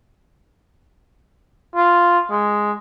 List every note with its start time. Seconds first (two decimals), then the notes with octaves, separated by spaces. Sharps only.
1.76 F4
2.30 G#3